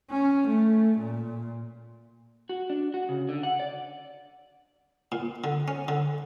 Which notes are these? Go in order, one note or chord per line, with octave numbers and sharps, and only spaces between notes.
C#4
A3
A#2
F#4
D4
F#4
C#3
D3
F#5
D5
A#2
D3
C#4
D3